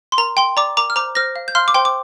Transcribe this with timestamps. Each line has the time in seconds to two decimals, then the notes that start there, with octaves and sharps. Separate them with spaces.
0.12 C6
0.18 A#4 A#5
0.37 G5 C6
0.57 D5 A#5 D6
0.77 A#4 A#5 D6
0.90 F6
0.96 C5 A#5 D6
1.15 C5 F6 A#6
1.36 F5
1.48 G6
1.55 F5 C6 F6
1.68 D6
1.74 C5 G5 C6
1.85 D6